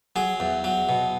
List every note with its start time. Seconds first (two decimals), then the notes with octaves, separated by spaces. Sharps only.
0.16 F#3 G#4
0.40 E2
0.64 F#3
0.89 B2